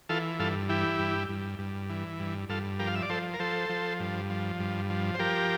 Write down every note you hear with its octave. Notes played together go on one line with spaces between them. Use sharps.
E3 F4 A4
G2 F4 A4
E3 E4 G4
G2
G2
G2
E3
G2
G2 F4 A4
F3 G4 A#4
F5
E5
D5
F3 A4 C5
A#4
F3 A4 C5
F3
G2
F3
G2
F3
C5
F3 G4 A#4